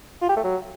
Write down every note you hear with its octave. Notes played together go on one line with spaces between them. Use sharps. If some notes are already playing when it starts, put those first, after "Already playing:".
F4
G4
A3
F#3